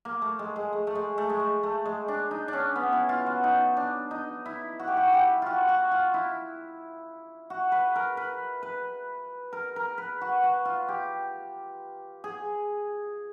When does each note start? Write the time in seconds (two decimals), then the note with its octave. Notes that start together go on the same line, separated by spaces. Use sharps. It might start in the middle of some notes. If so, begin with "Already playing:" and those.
0.05 A#3
0.22 A3
0.39 G#3
0.56 G#3
0.73 A3
0.87 A3
0.95 G#3
1.18 A3
1.29 G#3
1.40 A3
1.63 A3
1.85 G#3
2.08 D4
2.31 D#4
2.48 D4
2.53 C#4
2.76 B3
2.92 E4
3.09 F4
3.26 F#4
3.44 D#4
3.77 D4
4.11 D#4
4.46 E4
4.79 F#4
4.87 G4
4.97 F#4
5.13 G4
5.42 F4 F#4
5.69 F#4
5.91 F4
6.14 E4
7.50 F#4
7.72 B4
7.95 A#4
8.17 B4
8.63 B4
9.53 A#4
9.76 A#4
9.98 B4
10.21 F#4
10.43 F#4
10.65 F4
10.88 G4
12.24 G#4